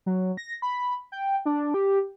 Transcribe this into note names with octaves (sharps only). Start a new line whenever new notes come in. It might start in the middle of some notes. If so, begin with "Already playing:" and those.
F#3
A#6
B5
G5
D4
G4